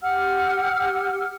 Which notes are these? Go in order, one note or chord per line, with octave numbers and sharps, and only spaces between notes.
G4 F#5 E6 F6